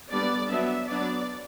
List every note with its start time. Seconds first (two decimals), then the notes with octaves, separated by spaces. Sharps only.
0.10 D3 G3 B3 D4 D5
0.49 F#3 B3 D4 E5
0.88 F#3 B3 D4 D5